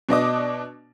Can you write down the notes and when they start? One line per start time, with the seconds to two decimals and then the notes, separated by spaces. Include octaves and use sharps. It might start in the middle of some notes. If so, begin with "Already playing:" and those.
0.09 B2 D4 D#5 D6